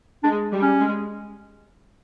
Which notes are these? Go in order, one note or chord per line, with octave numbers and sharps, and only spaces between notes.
G#3 D4
G3
C#4
G#3